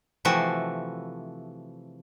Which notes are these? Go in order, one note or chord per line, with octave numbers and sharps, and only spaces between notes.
C3 E3 F3 A3 F#4